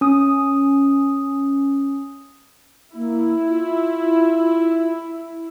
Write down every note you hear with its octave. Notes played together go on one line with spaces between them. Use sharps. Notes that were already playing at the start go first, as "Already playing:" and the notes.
C#4 D#6
A#3 E4
F4